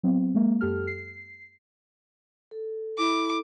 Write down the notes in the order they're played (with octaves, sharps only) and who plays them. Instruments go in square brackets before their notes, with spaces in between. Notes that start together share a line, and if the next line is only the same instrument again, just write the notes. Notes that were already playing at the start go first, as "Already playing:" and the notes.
[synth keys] F#3 B3 C4
G#3 A#3
F#2 G4 A4 F6
C7
[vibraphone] A4
[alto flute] E4 [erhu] D6